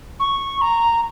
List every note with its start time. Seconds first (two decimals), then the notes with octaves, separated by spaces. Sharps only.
0.20 C#6
0.61 A#5